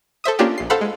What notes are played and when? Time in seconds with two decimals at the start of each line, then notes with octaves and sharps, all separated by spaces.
0.24 A4 C5 E5 D#6
0.39 A#3 C#4 D4 F4 G4
0.58 A#1 C7
0.70 A4 C5 F5 F#5 B5
0.81 G#3